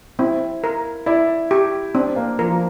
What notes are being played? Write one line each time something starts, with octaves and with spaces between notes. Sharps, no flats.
C4 E4
A#4
E4 D5
G4
C4 D4
A#3
F3 A#4
F3